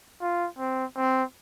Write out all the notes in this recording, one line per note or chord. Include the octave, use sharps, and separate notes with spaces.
F4
C4
C4